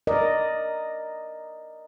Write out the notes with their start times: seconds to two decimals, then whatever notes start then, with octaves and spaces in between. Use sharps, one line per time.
0.07 A#4 D5 D#5